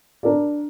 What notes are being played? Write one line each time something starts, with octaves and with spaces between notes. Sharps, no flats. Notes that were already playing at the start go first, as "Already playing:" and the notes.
D4 A#4 D5